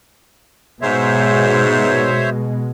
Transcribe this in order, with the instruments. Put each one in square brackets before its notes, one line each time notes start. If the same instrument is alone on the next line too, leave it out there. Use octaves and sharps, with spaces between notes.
[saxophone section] G#2 [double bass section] B2 G#3 [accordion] C5 C#5 E5